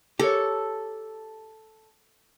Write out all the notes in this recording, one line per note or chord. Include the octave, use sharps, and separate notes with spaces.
G4 A4 A#4 C#5